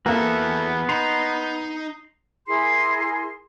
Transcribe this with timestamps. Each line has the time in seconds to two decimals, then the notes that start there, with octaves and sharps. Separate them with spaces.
0.06 E2 A#3 B3 F#4 A4 E5
0.89 D#4 A#5 C6
2.47 E4 G#4 A#4 C6